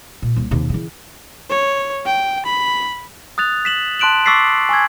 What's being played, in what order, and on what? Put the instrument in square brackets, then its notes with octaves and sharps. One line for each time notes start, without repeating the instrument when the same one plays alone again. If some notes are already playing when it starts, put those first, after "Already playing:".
[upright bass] A#2
C2 A#3
D#2 C3
C#3 E3
[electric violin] C#5
G5
B5
[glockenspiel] D#6 F#6 A6 F7
B6 E7 F#7
A5 C6 F#6 D7 E7 F#7
C#6 D6 E6 A6 B6 C7
G#5 C#6 E6 G#6